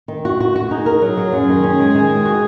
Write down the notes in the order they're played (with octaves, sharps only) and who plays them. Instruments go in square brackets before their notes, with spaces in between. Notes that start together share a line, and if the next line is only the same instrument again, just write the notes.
[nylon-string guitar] D#3
F#4
F#4
F#4
[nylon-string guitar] D#4 [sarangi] G#4
[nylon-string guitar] A#4
F#3
F#3
F#2
D#3
C#4
G#3
D#3
G#3
F#4